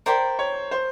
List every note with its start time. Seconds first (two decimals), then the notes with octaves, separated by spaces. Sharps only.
0.06 A#4 C5 D5 G5 B5
0.39 C#5
0.71 C5